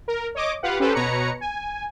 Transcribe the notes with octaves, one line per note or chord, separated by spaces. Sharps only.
A#4
C#5 D#5 D6
F4 G4 B4 F5 F#5
C#4 G4 A4 B4 C5
B2 B4 C#5 A#5 C#7
G#5